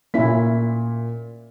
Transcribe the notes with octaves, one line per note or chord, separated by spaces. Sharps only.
A#2 A#3 C#4 E4 B6